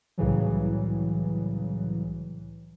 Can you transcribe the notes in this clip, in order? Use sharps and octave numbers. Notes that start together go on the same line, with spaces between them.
C2 A2 C#3 E3 F#3